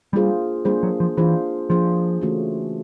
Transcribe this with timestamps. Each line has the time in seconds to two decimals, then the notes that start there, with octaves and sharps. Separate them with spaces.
0.13 G3 A#3 D4 F4 G#4 C5
0.65 G3 A#3 D4 F4 G#4 C5
0.83 F#3
1.00 F3
1.17 E3 A#3 D4 F4 G#4 C5
1.70 F3 A#3 D4 F4 G#4 C5
2.21 C#3 E3 A3 C#4 F#4